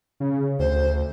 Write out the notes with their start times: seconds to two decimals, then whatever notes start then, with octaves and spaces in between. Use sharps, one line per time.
0.20 C#3
0.59 D2 C5